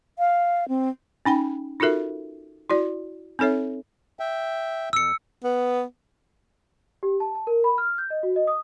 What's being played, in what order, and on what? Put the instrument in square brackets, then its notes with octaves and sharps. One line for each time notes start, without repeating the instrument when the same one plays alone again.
[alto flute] F5
C4
[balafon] C#4 D#4 G5 B5
D#4 F4 F#4 A4 A#4 E5
E4 F#4 D5
C4 D#4 A4 C#5 E5
[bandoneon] E5 G5
[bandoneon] F2 [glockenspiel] E6 C#7
[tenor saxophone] B3
[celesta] G4
A5
A5
A#4
B5
F6
G6
D#5
F#4
D#5
D#6